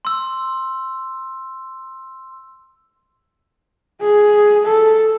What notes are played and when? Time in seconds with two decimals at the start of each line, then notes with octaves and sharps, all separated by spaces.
0.05 C6 E6
4.02 G#4
4.66 A4